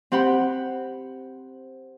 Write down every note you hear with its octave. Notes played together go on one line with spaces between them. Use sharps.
C4 G4 F#5 B5